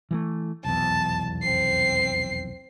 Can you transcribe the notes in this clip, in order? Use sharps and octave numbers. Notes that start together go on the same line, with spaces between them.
E3 F#3 A3
F1 B1 E2 A5
C4 C7